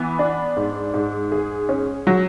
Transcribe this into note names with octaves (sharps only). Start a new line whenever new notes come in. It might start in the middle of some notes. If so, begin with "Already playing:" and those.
Already playing: E3 B3
D4
G#2
G#2
G#4
C#4
F#3